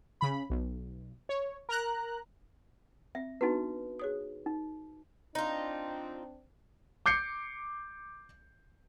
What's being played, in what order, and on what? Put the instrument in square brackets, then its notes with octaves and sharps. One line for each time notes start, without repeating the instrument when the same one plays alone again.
[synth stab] C#3 B5
B1
C#5
A#4 A#5 F#6
[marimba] C4 [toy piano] E5
[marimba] B3 D4 [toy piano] D#4 F#4 B4
[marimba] G#4 C#5 D#6
[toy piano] D#4
[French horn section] C4 D4 [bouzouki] D#4 F4
[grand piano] D6 G6 C7 C#7